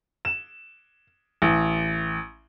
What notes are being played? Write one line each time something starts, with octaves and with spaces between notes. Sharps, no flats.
E7
A1